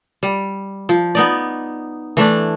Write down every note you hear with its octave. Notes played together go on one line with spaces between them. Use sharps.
G3
F3
B3 D#4 D5
E3 A3 D4